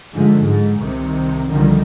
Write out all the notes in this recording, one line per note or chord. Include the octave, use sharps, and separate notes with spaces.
G#2 D3 F3 G#3 A3
G#2
C2 C3 D#3
C2 D3 D#3 F3 G3